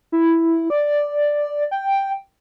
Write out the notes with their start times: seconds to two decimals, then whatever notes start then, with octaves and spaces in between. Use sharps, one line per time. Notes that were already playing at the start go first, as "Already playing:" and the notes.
0.12 E4
0.70 D5
1.71 G5